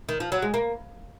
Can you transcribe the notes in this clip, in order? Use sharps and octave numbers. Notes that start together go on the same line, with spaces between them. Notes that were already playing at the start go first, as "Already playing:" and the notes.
D#3
F3
F#3
G#3
A#3